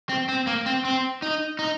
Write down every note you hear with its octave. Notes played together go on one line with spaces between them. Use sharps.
C4
C4
A#3
C4
C4
D#4
D#4